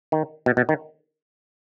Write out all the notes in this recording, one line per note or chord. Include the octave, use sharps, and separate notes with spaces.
D#3
B2
B2
D#3